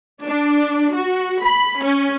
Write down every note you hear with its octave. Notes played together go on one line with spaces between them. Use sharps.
D4
F#4
B5
C#4